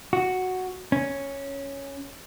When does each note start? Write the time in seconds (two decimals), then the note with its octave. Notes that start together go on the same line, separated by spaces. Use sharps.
0.13 F#4
0.92 C#4